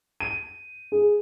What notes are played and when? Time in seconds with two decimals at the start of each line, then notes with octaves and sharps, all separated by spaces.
0.20 D#7
0.92 G#4